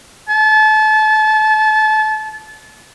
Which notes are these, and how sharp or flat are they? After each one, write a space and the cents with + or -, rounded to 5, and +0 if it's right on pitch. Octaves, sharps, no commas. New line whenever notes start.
A5 -30